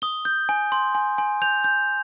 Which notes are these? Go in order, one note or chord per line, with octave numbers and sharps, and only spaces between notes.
D#6 G7
G6
G#5
C6
G#5
G#5
G6 F7
G6